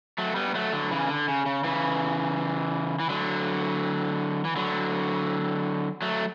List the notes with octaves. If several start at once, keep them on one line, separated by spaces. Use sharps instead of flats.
F#3 A3
G3 B3
F#3 A3
D3 F#3
C#3 E3
D3
C#3
C#3
C#3 E3
E3
D3 F#3
E3
D3 F#3
F#3 A3